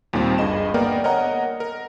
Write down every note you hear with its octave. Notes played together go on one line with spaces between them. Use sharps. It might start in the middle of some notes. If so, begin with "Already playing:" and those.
D#2 A#2 D#3 G3 C4
G1 G2 G#4 D#5 E7
A#3 B3 A#4 D5 G5
A#4 C#5 D#5 F#5 A#5
A#4